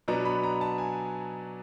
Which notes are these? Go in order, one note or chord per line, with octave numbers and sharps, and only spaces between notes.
B2 F#3 B3 D4 A#5
B5
A#5
A5
G#5